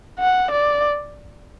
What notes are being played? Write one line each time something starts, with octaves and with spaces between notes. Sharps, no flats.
F#5
D5